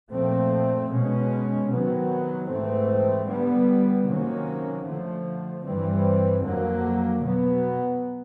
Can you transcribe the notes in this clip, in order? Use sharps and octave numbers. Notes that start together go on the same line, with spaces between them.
A#2 F3 A3 C4
B2 G#3 C#4
C3 D#3 F#3 B3
G#2 E3 A3 C4
D3 G3 B3
C3 D#3 F#3 A#3 C#4
D3 F3 A3
G2 E3 G3 C4
F2 D3 F#3 A#3
B2 F#3 B3